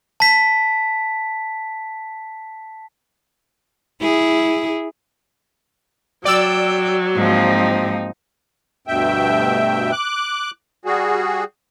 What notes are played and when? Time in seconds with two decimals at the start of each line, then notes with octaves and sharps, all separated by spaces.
0.20 A5 B6
4.01 E4 G#4
6.25 F#3 D5 G5 E6
7.15 G#2 F3 A#3 C4 D#4
8.87 D2 G2 B2 E5 G5
9.92 D6 F#6
10.85 G3 F#4 G#4